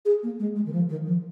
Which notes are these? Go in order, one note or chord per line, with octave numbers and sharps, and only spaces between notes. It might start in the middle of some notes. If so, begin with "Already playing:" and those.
G#4
A#3
G#3
G#3
D#3
F3
D#3
F3